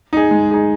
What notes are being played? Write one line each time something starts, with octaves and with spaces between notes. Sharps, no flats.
D#4 G#4
G#3
D#4 G#4